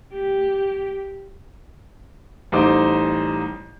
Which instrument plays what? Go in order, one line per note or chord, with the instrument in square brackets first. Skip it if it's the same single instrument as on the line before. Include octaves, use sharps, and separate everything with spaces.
[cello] G4
[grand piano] A1 G3 D#4 C5 D6